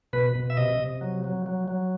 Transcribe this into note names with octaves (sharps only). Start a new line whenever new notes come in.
B2 B4
B2
E5
C3 D#5
C3
F#3
F#3
F#3
F#3